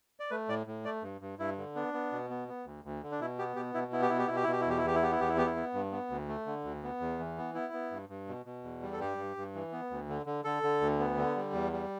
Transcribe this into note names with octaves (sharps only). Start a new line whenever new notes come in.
D5
A3 B4
A2 D5
A2
A3 D5
G2
G2
G2 E4
D3
B3 D4
B3
B2
B3
B3
D2
D2
D3
D4
B2 E4
B3 G4
B2 G4
B2 E4
B3 E4
G4
B2 E4
G4
B2 E4
G4
E4
B2
G4
E4
E2 G4
E4
E2 G4
E4
B3 G4
E4
E2 G4
E4
B3 G4
E4
B3
G2
B3
D2
A3
D3
D2
B3
E2
E3
B3
B3 E4
B3
G2
G2
B2
B2
E2
G3
A4
G2 G4
G2
G2
E3
B3
D2
D3
D3
D3 A4
D3
D2
B3
D3
G3
E2
G3